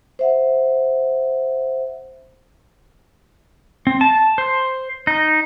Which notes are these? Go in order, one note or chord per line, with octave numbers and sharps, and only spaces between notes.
C5 E5 F#5
C4
A5
C5
D#4